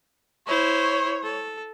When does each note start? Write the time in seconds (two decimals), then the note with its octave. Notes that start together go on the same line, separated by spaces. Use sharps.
0.47 E4 C5 C#5
1.24 A4